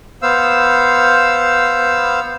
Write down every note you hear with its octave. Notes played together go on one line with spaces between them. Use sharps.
B3 C5 F5 E6